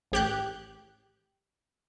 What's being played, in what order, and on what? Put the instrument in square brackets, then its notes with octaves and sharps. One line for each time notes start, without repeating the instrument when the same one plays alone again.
[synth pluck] A1 G4 F#6 G6